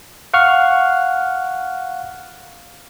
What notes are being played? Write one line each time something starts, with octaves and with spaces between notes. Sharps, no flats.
F5 F#5 C#6 F6